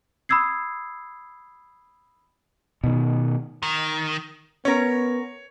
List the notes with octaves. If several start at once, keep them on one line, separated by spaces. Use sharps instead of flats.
B5 D#6 E6 G#6 C7
B2 D#3
D#3
B3 C#4 A#4 C#5 C#6